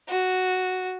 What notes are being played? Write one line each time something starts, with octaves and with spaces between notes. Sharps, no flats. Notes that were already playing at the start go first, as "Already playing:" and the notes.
F#4